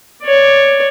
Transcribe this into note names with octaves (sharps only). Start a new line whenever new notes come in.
C#5 D5